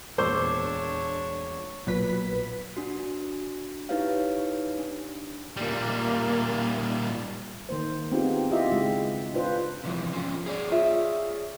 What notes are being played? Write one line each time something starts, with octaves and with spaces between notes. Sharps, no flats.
E1 A#2 D4 C5 C#5 C#6 D6 E6
B1 A#2 F#3 B4 B6
D4 F#4
D#4 E4 G4 B4 C#5 F5
D4
A#2 G3 A#3
D#3 A#3 C5
B3 C4 D#4 F4 G4 G#4
E4 F4 G4 D#5 E5
C#3 G#3
D4 F4 B4 C5
C3 E3 F3
F3 C#4 F4
G#4 C#5 D5
F4 E5